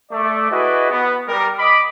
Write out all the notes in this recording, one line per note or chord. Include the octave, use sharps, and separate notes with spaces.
A3 D5
E4 F#4 G#4 B4 D5 D#5
B3
G3 A#4
D#5 B5 D6